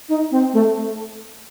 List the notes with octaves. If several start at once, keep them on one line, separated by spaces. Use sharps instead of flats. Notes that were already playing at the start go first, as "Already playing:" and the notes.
D#4
C4
A3